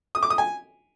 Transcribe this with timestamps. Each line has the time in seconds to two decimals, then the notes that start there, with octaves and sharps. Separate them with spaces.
0.15 D#6
0.23 D6
0.30 D#6
0.38 G#5